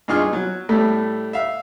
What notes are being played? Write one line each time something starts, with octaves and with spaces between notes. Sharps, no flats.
G2 D#4 F4 G#4 C#6 F6
F#3
A2 G3 A3
E5 F5